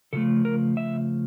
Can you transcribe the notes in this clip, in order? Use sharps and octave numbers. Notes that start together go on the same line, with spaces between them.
C#3 F3 A3 A4
A#4
E5